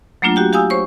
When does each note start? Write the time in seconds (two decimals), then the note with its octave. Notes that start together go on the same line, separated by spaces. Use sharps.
0.22 F#3 A3 A#3 D4 F4
0.36 F#4 G4 G5
0.53 G4 F5 G#5 D#6 E6
0.70 C5 C#5 C#6